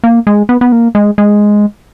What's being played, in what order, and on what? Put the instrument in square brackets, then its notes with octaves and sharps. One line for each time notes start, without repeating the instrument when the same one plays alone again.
[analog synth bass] A#3
G#3
B3
B3
A#3
G#3
G#3